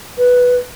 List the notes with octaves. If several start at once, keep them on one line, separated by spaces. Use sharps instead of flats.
B4